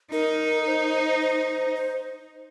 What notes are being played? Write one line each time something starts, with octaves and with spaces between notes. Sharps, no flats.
D#4 A#4
C5
C5
C5